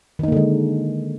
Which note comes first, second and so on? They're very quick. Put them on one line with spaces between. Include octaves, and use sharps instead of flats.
D#3 D#4 A#3 D3 G#3